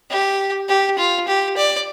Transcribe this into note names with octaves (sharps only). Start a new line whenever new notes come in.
G4
G4
F4
G4
D5